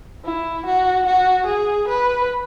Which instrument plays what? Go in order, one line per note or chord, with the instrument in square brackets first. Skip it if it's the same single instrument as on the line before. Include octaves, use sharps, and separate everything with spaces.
[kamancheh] E4
F#4
F#4
G#4
B4